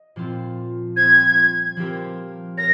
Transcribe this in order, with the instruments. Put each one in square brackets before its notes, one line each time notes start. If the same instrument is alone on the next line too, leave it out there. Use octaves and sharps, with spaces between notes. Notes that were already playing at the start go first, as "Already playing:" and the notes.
Already playing: [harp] D#5
A#2 F3 C4 F4
[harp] G3 C4 F4 C5 [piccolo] G#6
[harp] F3 C4 G4 A#4
[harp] A#4 C#5 [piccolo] A#6